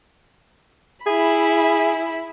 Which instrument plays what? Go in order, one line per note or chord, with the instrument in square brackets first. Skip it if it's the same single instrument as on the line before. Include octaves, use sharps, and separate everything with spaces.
[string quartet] E4 B5 [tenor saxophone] G#4